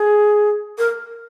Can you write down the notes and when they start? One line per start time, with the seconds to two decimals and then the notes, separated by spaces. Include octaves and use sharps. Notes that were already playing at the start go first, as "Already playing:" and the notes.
Already playing: G#4
0.78 A#4